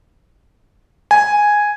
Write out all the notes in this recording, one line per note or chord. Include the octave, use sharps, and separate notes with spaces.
G#5